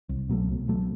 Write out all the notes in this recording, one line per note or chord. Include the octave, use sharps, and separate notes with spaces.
C2
B2 F#3 A3
C2
B2 F#3 A3